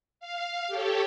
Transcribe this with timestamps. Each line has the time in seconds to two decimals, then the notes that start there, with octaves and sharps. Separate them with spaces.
0.20 F5
0.67 G4 A4 C#5